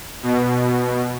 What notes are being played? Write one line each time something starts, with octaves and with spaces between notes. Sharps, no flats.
B2